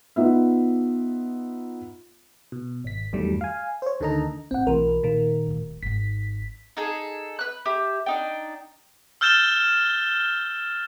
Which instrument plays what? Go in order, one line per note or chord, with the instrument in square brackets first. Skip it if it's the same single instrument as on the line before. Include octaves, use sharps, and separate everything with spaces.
[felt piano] B3 D#4 F4 E5
[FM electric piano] B2
G#1 B6
E2 G2 D#3 F#3 G3 A3
F5 G#5
C5 C#5
D2 D3 D#3 A4 D#5 A#5
[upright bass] A1 [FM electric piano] C4 F#5
[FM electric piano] B1 E3 A#4 [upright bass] A3 A#3
[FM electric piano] A#2 D#3 A#4
[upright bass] D1 D#2
[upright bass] G#1 D#4 [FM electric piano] B6
[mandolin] D#4 G#4 A4
B4 F#6
G4 E5
D4 D#4 G5
[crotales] E6 F6 G6 A6 E7 G7